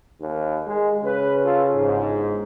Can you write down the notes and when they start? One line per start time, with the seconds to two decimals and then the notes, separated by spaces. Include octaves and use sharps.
0.20 D#2
0.67 G#3
1.04 C#3 B4
1.44 F4 A4
1.75 G1 G#2